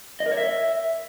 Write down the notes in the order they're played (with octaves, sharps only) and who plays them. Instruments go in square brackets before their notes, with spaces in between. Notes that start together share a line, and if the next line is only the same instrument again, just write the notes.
[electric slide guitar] D#5
A#4
C#5
E5